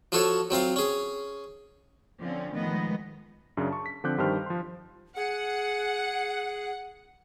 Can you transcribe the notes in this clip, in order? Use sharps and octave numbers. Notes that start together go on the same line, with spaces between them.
F3 F4 F#4 A4 C#5
F#3 C4 F4 F5
C#4 G#4
D3 F3 C4 C#4
A2 D#3 F3 G#3 B3 D#5
F#2 C#3 C#4 D4
A5 C#6
B6
D3 F3 C4 D6 F#6 G6
G2 D#3 G4 C5 A5 F6
F3 C6
G#4 F#5